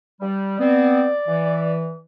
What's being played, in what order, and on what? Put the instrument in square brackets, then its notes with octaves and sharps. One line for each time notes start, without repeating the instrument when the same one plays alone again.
[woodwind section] G3
[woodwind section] B3 C4 [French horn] D5
[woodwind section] E3